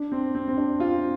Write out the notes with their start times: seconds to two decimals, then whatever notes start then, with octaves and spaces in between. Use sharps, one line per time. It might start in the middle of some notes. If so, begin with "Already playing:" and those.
Already playing: D4
0.12 C4
0.35 C4
0.48 C4
0.58 D4
0.79 C4 F4